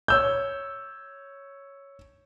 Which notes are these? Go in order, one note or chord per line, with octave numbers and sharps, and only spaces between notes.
C#5 E6 G6